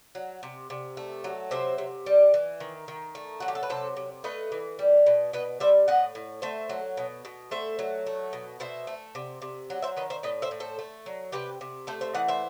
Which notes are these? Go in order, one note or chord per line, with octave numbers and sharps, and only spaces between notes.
F#3
C3
C3
A3
F#3
C3 C5 E5
C3
G3
E3
D#3
D#3
A3
F#3 F#4
G4
A4
B4
C3 A4 C5
C3
A3 B4 D#5
E3
G3
B2
B2 B4 D#5
G3 C5 E5
A2 D#5 F#5
A2
A3 C5 E5
F#3
B2
B2
A3 C5 E5
F#3
A3
B2
B2 C5 E5
A3
C3
C3
F#3
C5 E5
D#3 B4 D#5
C5 E5
A2 B4 D#5
C5 E5
A2
A4 C5
A3
F#3
C3 G4 B4
C3
A3 A4 C5
C5 E5
E3 D#5 F#5
C5 E5